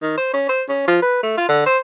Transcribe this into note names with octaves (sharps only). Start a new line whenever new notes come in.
D#3
C5
C#4
C5
C#4
F3
B4
A3
F4
D3
C5